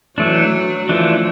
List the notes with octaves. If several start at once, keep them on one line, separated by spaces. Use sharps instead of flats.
E3 F#3 A3 D4
E3 F3 A3 D4